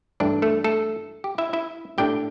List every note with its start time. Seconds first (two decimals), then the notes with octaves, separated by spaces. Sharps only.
0.20 G2 E3 A3 D4 D5
0.42 A3 A4
0.64 A3 A4
1.24 G4
1.38 E4 E5
1.53 E4 E5
1.98 A2 A3 D4 G4 G5